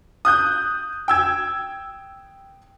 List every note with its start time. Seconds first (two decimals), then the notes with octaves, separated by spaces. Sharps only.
0.25 D#6 F#6 G6
1.08 G5 E6 G#6